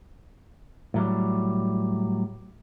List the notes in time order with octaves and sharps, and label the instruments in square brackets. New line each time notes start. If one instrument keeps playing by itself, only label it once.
[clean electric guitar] A2 F#3 G3